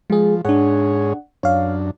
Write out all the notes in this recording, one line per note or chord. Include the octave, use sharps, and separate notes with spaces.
F3 G#3 G#4
G#2 D4 G#4 C#5 F#5
F#2 D4 C#5 F5